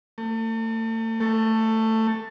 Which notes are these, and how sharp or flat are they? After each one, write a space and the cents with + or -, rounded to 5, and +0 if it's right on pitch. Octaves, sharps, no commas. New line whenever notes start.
A3 +40
A3 +15